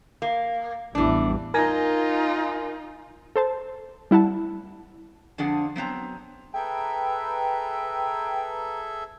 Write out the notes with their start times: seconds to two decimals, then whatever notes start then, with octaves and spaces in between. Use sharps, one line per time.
0.22 A#3
0.95 A1 E2 E3 G3 D4
1.54 D#4 F4 A#4 G#5 A#6
3.36 A4 C5 A5
4.11 G3 E4 F#5 A5
5.38 F2 D3 F3 D4 G#4 F#5
5.76 F#3 B3 C4 A#5
6.54 G#4 A4 B4 E5 G5 A#5